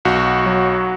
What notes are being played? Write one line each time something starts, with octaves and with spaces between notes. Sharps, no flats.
B1 F#4
F#3